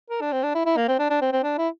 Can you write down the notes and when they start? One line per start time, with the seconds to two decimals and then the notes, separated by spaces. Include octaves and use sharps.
0.10 A#4
0.21 D4
0.32 C4
0.43 D4
0.55 E4
0.66 E4
0.77 A#3
0.88 C4
0.99 D4
1.10 D4
1.21 C4
1.33 C4
1.44 D4
1.58 E4